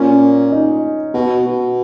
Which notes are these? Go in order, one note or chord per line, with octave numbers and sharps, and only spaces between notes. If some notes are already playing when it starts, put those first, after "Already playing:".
Already playing: A#2 C#4
D#4
B2 F#4
B2